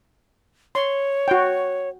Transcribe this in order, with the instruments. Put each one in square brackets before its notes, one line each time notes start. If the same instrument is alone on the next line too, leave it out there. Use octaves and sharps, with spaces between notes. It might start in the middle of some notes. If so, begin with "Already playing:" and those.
[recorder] C#5 [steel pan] C6
[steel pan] F#4 G5